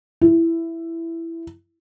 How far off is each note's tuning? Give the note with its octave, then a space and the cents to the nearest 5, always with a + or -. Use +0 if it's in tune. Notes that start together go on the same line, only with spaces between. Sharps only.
E4 +10